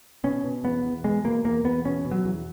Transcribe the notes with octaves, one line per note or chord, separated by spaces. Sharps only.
B2 C#4
B2
E2 B3
E2
B2 G#3
B2 A#3
E2 A#3
E2 B3
B2 C#4
B2
F#3
E2